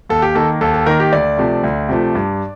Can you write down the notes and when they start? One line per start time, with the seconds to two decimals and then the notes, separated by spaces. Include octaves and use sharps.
0.09 D#2 A4
0.22 G4
0.35 D#3 A#3 A4
0.61 D#2 A4
0.74 A4
0.86 D#3 A#3 A#4
1.00 G4
1.13 D2 D5
1.38 C3 F3 A3
1.64 D2
1.89 C3 F3 A3
2.15 G2